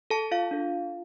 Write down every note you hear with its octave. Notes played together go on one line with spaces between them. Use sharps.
A4 A5
F4 F5
D4 A4